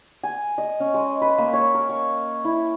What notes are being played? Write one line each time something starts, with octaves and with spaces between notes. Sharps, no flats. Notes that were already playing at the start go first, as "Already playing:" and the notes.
G#5
D#5
C#4
G#3
B4
A#3
C#5
A#4
C#6
E4